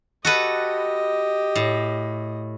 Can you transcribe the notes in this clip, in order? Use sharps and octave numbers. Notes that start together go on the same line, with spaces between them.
F#4 G4 A4 B4 D#5
A2